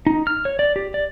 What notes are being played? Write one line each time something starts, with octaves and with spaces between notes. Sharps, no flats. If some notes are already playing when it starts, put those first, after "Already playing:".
D#4
F6
C#5
D5
G4
D5